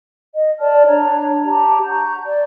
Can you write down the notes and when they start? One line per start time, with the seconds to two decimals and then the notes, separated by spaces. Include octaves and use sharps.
0.34 D#5
0.60 A#4 D5 A5 F6
0.86 D4 C#5 A#5
1.45 G4 A5 A#5
1.87 F#5 A#5 C#6 G6
2.25 D5